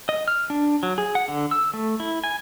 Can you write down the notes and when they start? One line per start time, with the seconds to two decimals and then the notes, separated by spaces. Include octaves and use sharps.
0.09 D#5
0.28 F6
0.50 D4
0.83 F#3
0.98 G#4
1.15 F#5
1.28 D3
1.51 E6
1.74 A3
2.00 E4
2.24 G#5